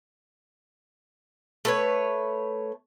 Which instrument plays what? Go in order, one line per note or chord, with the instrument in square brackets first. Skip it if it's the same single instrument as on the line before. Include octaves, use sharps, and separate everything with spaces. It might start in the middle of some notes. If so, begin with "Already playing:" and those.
[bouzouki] A3 B4 C#5